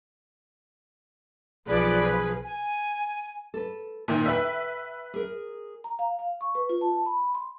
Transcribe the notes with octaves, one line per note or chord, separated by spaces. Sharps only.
B1 F3 G#4 B4 D5
G#5
A4 B4
A#2 D#3 A#4 C5 E5
B4 E5 F#5 G5
G#4 A#4
A#5
F5
F5
C#6
B4
F4
A5
B5
C6